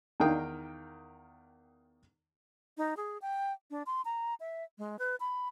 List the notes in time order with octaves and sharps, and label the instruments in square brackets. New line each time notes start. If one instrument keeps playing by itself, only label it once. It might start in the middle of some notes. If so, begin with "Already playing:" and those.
[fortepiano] E2 D#3 A#4 F5 G5 D#6
[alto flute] D#4
G#4
G5
D4
C6
A#5
E5
G#3
B4
B5